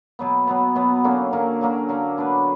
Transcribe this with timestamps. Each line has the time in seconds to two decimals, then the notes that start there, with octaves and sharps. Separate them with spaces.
0.19 B2 F#3 B3
0.47 B2 F#3 B3
0.75 B2 F#3 B3
1.04 D3 F#3 A#3 C#4
1.32 D3 F#3 A#3 C#4
1.61 D3 F#3 A#3 C#4
1.89 D3 F#3 A#3 C#4
2.18 B3 D4 F#4 B4